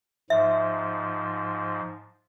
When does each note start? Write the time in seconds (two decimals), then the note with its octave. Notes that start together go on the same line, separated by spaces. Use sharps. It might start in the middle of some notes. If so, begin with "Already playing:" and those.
0.30 G#2 F3 E5